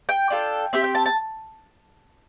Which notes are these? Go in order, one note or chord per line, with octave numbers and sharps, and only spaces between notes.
G5
D4 F4 A4
C4 G4 E5
G5
A5
A5